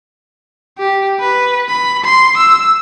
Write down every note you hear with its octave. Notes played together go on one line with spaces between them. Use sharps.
G4
B4
B5
C6
E6